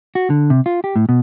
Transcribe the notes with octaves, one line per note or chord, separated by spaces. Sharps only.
F#4
D3
C3
F4
G4
A2
B2